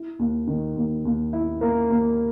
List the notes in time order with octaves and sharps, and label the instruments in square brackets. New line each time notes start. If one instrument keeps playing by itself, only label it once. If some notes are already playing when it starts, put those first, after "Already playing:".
Already playing: [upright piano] E4
D#2
D#3
D#2
D#2
E4
A#3
D#2